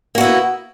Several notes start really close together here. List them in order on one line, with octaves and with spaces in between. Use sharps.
A#3 F#4 E4 B3